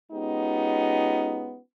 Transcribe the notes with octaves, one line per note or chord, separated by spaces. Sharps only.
G#3 B3 C#4 D#4 F4 G4